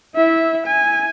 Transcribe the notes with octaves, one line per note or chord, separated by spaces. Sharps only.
E4 E5
G#5